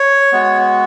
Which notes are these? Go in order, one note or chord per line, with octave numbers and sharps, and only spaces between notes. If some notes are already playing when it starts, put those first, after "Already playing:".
Already playing: C#5
G#3 B3 F#4